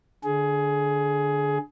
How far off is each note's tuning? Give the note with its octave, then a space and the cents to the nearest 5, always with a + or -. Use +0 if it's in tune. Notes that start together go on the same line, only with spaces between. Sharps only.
D3 +0 G#4 +15